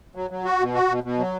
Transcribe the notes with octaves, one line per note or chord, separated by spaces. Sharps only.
F#3
F#3
F#4
B2
F#4
B2
B2
F#3